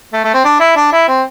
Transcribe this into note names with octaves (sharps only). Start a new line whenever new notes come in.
A3
A3
C4
D4
E4
D4
E4
C4